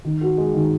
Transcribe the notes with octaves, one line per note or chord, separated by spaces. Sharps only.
D#3
F#4
G#3
D#3